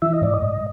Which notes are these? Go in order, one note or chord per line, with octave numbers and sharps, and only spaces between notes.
E3 E5
D#5
G#2 D5
D#5
G#2